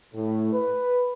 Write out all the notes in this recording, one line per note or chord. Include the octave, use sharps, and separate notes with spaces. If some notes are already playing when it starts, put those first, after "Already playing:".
A2
B4